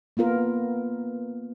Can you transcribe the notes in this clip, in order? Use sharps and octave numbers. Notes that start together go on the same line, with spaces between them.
A#3 B3 F4 A#4